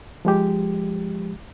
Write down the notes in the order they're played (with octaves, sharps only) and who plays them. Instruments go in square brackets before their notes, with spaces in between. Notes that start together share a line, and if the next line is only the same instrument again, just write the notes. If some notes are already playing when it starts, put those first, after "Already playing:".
[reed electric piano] F3 G#3 G4